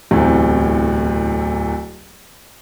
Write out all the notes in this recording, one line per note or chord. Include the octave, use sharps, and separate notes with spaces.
D1 E2 A2 C3